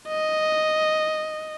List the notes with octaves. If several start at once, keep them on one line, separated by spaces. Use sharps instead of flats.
D#5